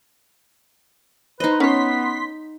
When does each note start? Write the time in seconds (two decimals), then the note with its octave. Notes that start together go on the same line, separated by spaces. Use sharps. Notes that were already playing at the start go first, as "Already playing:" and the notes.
1.40 D#4 B4 C5 D#5
1.60 B3 C#4 C#5 C6 B6